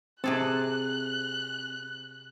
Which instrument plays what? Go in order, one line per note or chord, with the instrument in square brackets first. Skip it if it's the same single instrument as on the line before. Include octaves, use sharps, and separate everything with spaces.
[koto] C3 G#4 A4 [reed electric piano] C4 [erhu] F#6